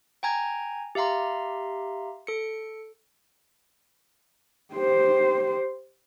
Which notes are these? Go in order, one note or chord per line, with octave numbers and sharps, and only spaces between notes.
G5 G#5 A#5 G#6
G4 E5 F5 A#5 C6
A4 C#7
G4 C5